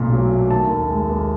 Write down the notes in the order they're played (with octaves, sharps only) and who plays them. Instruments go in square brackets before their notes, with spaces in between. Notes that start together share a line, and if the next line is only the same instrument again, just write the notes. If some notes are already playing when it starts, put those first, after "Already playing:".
Already playing: [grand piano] B1 A#2 A#3
F#3
A3
D#3 A5
D#2
G#3
D#2